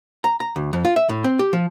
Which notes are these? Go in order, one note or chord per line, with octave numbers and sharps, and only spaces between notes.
A#5
A#5
D2
F2
F4
E5
A2
C4
G4
F3